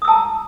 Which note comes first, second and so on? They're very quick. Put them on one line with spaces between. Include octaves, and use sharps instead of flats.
D#6 E6 A5 A#5